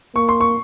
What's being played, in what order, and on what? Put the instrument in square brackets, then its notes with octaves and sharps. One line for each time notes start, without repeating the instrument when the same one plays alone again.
[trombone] A#3 [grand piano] C#6
[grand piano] C6
C#6